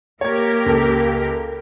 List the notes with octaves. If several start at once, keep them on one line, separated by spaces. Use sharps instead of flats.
A#3 G4 A#4 C#5 G#6
C#2 A4